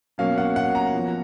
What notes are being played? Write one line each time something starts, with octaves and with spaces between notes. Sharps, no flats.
B2 F#3 A#3 C#4 F5
F#5
F#5
A#5
F3 B3